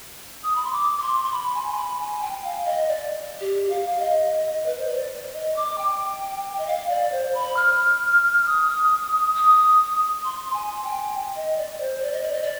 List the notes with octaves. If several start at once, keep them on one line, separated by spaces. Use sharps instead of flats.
D#6
B5
C6
D6
D6
C6
C6
B5
G#5
C6
B5
G#5
G5
F5
D#5
D5
G4
F5
F5
D#5
B4
C5
D5
D#5
D6
G5
D#5
F5
D5
C5
B5
F6
D#6
D#6
C6
G#5
G5
D#5
D5
C5
D5
D#5
D5
D#5
D5